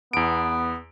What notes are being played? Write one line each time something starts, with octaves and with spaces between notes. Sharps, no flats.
E2 B3 D7